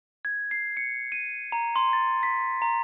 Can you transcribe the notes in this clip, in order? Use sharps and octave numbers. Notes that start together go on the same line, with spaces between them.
G#6
C7
C#7
D#7
A#5
C6
A6
B6
A#5